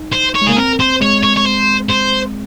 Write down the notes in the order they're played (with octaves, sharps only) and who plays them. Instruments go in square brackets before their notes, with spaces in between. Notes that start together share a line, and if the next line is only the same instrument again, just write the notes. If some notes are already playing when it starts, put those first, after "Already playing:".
Already playing: [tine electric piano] D#4
[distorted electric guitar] C5
C#5
[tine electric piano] G#3
[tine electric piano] A#3 [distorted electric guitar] G#4
[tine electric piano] C4 [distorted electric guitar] A#4
[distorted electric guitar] C5
[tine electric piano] G#3 [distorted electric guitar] C#5
[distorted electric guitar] C#5
C#5
C5
C5